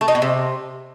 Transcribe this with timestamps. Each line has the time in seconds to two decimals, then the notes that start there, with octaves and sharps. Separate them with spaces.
0.01 A3
0.08 D#4
0.15 B2
0.22 C3